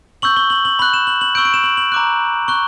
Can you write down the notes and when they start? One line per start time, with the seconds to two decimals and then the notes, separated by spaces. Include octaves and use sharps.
0.22 C#6 E6 G6 F#7
0.37 G7
0.50 F#7
0.65 F#7
0.79 B5 F#6 F#7
0.94 E7
1.07 F#7
1.21 F#7
1.35 C#6 E6 G6 D7
1.45 D7
1.54 E7
1.64 F#7
1.77 F#7
1.92 A#5 D6 F#6
2.48 C#6 F#6 G7